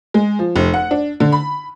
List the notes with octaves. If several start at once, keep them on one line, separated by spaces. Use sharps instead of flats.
G#3
F3
F1
F#5
D4
D3
B5